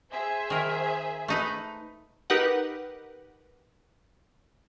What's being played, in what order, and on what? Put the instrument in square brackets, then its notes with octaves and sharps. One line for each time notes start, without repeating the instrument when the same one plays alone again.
[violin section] G#4 C5 E5
[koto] D#3 A#4
A3 D#4 B4
[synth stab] D#4 G4 A#4 B4 F#5